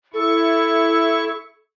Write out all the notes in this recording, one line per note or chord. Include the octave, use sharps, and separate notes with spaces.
E4 A4 C#6